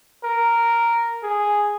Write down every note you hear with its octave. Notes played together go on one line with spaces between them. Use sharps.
A#4
G#4